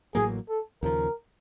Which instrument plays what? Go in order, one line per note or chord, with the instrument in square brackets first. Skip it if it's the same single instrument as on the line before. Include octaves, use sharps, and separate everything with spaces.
[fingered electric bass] A1 A2 F#3 A#3 [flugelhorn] G#4
[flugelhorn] A4
[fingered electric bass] D#2 C#3 F3 [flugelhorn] A#4